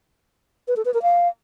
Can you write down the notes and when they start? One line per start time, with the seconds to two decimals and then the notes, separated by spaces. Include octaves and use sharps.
0.68 B4
0.76 A4
0.85 B4
0.94 A#4
1.03 F5